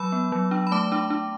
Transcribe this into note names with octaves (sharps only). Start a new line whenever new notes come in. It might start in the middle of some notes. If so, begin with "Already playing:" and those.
Already playing: F#3 B5 E6
B3
F#3
D4
B5
A3 A5 D6
D4
D4